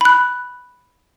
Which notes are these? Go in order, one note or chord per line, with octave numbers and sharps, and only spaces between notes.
B5 F#6